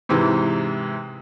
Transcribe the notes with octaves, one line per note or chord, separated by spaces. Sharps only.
G#2 C3 E3